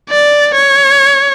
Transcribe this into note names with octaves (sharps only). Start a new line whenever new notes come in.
D5
C#5